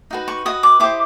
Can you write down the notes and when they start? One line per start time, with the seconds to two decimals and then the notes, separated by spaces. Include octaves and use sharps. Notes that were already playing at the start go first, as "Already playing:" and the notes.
0.11 D#4 F#4 B4
0.28 C#6
0.45 F#4 B4 D#5 D#6
0.63 D6
0.80 E4 G4 C5 D#5 D6